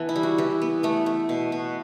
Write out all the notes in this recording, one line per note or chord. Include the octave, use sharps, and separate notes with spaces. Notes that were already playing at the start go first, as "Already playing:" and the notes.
Already playing: E3 B3 A4
E4
G3
F#4
E3 G4
B3
A3 B3
A3
B2
B2